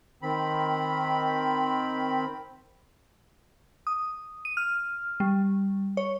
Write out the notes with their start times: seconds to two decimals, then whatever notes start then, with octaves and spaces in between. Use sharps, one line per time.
0.23 D#3 C4 B5
3.87 D#6
4.45 D#7
4.57 F6
5.20 G3
5.97 C#5